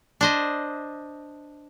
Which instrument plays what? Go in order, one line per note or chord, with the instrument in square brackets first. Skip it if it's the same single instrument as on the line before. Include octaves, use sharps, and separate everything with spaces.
[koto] D4 C5 D#5